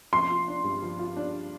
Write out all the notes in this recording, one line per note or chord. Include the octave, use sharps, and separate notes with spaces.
F3 C6
F4
D4
G2
F3
F4
D4